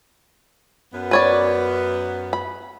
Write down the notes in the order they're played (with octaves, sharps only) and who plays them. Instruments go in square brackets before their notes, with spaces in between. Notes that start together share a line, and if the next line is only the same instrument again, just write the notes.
[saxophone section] F#2 B3
[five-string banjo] B4 C#5 D5
B5